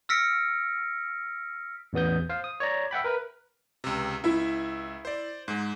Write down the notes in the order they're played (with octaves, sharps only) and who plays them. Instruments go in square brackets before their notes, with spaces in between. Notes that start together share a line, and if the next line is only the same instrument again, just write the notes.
[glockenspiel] E6 F6 A#6 B6 C#7 D7
[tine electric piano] A1 E2 B3 D#6 G6
C5 F5
D#6
C#5 D5 A#5
E5 F#5 G5 B5
A#4 B4
[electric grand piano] C#2 C3
[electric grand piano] C#2 E5 [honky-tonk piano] E4
[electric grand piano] C5 D5
G#2 G#3